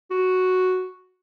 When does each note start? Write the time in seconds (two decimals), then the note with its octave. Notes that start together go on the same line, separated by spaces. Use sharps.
0.10 F#4